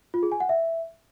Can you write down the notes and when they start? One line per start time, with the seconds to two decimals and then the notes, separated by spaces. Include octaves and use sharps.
0.14 F4
0.23 G#4
0.32 G#5
0.40 F#5
0.49 E5